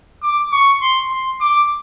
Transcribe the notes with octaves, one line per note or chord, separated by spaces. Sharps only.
D6
C#6
C6
C6
D6